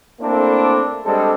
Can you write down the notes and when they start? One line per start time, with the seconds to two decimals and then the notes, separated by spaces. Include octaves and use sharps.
0.20 A3 A#3 C4 D4 E4 A4
1.05 G3 G#3 C4 D4 A4